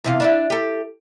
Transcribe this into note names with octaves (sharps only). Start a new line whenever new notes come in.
E2 C3 F4
D4 E4 E5
G4 A4